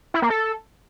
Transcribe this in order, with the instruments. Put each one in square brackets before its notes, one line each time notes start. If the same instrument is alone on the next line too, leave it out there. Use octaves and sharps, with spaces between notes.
[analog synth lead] E4
A#3
A4